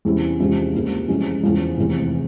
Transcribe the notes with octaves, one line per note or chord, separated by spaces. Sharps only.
E2 C3 G3 C#4 E4
E2 C3 F3 G#3 C#4
C#2 C3 E3 G3 A#3
F2 C3 E3 G#3 C#4
E2 C#3 F3
F1 E2 C3 E3